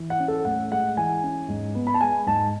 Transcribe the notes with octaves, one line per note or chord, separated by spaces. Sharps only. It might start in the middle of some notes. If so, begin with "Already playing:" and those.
Already playing: E3
F#5
C#4
A4
A2 F#5
G#3 F#5
E3 G#5
C#4
G#2
B3
B5
A5
G#3 G#5
G#2 A5